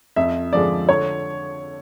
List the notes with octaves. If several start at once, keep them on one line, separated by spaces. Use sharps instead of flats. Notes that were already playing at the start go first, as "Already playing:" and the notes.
F2 E5
D3 F3 G#3 D5
D3 C#5